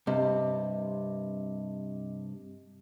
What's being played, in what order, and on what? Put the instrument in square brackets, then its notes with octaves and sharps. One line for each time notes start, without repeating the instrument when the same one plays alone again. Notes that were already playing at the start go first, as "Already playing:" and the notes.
[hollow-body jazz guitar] G2 C3 [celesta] D#5